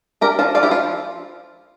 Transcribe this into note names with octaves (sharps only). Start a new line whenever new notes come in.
D4 G4 A#4
F3 F5 A5
F3 D5 F5
E4 G4
F3 F4